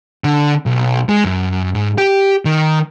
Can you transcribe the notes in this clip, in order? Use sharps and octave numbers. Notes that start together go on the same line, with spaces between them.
D3
B1
G#3
F#2
G#2
G4
D#3